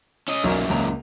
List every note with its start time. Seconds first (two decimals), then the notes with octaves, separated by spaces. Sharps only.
0.28 C#4 D#5
0.44 B1 F#2 A#2 A#4
0.70 C#2 A#3 F7